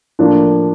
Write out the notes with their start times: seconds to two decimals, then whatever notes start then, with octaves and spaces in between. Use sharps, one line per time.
0.19 A2 F3 A#3 D4